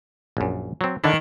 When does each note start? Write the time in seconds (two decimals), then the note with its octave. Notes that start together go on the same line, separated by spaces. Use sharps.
0.37 A#1 F#2
0.81 F#3 C4
1.04 D3 D#3 D4 E4